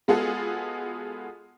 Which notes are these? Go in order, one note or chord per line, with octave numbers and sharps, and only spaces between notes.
G#3 B3 F4 F#4 G#4 A4